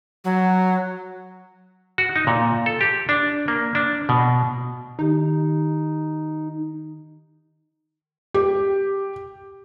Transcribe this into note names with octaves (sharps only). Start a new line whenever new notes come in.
F#3
F#4
D#4
A#2
A4
G4
D4
A#3
D4
B2
D#3 D#4 G4
G4